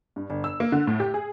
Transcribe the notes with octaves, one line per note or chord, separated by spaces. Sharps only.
G2
G1
E6
A#3
D3
A2
G4
G#4